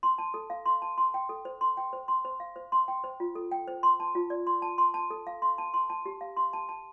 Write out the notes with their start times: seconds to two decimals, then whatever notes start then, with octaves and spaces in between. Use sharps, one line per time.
0.03 C6
0.18 A5
0.34 A4
0.50 F5
0.66 C6
0.82 A5
0.98 C6
1.14 G5
1.29 A4
1.45 C5
1.61 C6
1.77 G5
1.93 C5
2.08 C6
2.25 C5
2.40 F5
2.56 C5
2.72 C6
2.88 G5
3.04 C5
3.20 F4
3.35 A4
3.52 G5
3.68 C5
3.83 C6
4.00 A5
4.15 F4
4.30 D5
4.47 C6
4.62 A5
4.78 C6
4.94 A5
5.10 A4
5.27 F5
5.42 C6
5.58 A5
5.74 C6
5.90 A5
6.06 G4
6.21 F5
6.37 C6
6.53 A5
6.69 A5